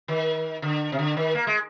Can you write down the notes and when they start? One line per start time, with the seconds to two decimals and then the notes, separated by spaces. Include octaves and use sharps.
0.08 D#3
0.62 D3
0.92 C3
0.99 D3
1.17 D#3
1.35 A#3
1.47 G#3